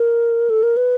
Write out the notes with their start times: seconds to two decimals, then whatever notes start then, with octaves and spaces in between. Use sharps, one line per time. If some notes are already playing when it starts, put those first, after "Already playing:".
Already playing: A#4
0.50 A4
0.63 A#4
0.77 B4